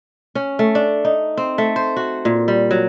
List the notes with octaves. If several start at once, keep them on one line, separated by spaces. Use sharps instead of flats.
C#4
A3
D4
D#4
C4
A3
C5
F#4
A#2
G3
F#3